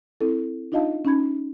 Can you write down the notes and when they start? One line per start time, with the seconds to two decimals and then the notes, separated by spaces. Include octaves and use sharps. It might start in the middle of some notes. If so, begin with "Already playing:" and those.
0.21 C4 E4 A4
0.72 D4 D#4 F4 D#5 F5 A5
1.05 C#4 D#4 B5 G#6